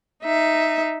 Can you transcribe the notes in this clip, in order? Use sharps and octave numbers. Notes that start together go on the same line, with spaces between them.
D#4 E5